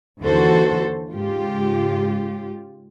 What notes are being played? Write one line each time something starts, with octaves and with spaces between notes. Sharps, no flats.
D#2 D3 E3 F#4 A4 C5
G#2 C#3 F4 G4